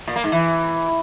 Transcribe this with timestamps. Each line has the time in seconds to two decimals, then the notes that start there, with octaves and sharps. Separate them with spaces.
0.07 A#2
0.16 A#3
0.24 G#2
0.32 E3